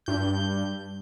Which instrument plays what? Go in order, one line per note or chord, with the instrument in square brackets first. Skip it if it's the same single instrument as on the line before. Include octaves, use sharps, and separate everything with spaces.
[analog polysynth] G2 G6